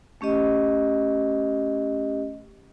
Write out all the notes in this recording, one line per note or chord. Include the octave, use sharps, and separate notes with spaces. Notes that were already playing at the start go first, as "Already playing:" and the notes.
A3 C#4 G4 D#5